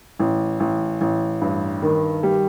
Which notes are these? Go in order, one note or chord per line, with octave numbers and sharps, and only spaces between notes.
A1
A1
A1
G2
D#3
G3